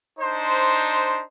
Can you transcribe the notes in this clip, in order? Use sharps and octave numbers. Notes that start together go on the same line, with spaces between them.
D4 D#4 C5